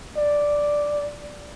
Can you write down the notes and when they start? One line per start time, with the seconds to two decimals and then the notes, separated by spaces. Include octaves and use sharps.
0.17 D5